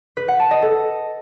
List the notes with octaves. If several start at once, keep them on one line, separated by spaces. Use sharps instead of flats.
B4
F#5
A5
D#5
A4